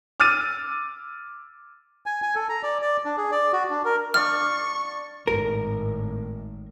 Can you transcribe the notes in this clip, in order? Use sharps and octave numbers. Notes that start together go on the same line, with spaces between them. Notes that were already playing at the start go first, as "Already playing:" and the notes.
D6 E6 F6 A6 D#7
G#5
G#5
A4
A#5
D5
D5
D4
G#4
D5
F#4
D4
A#4
D4 D5 F5 C#6 F6
G#1 A2 A#4